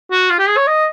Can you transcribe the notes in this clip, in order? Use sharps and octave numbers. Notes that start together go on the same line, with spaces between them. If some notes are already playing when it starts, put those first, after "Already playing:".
F#4
F4
G4
G#4
C#5
D#5